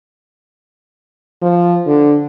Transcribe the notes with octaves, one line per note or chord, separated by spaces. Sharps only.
F3
D3